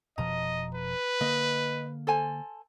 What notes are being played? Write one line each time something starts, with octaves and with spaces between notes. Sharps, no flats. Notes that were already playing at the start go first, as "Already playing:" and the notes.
F1 B2 F3 D#5 A#5
B4
D3 A#3 D#5
A4 C5 G#5